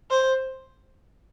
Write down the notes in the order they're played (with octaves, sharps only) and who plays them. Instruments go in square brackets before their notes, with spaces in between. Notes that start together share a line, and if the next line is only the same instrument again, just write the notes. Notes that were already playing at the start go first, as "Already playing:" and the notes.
[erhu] C5